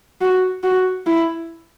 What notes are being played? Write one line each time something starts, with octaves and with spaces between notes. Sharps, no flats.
F#4
F#4
E4